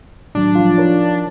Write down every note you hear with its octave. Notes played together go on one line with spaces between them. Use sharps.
A2 D#3 F#3 D4
F3 F4
D#4 A#4 C#5